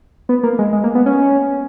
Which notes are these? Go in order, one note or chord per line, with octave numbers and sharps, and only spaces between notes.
B3
A#3
G#3
G#3
A#3
B3
C#4